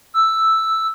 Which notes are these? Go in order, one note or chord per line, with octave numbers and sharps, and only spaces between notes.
E6